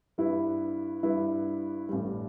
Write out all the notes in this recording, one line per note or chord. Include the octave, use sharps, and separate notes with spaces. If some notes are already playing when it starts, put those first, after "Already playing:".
G2 G3 E4 B4
G2 G3 E4 B4
A1 G2 G3